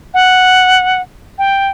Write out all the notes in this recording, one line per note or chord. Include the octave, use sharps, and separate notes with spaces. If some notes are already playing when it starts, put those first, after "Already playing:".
F#5
G5